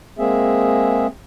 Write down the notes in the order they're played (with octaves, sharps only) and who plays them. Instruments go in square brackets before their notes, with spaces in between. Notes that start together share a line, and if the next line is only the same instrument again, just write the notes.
[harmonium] G#3 A#3 C4 G#4 E5